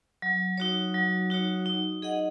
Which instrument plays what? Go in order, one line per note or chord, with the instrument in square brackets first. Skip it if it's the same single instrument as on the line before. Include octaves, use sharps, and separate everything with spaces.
[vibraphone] F#3
D#4 F#4 C#5
F#3
D#4 F#4 C#5
D#4
G#4 D#5 F#5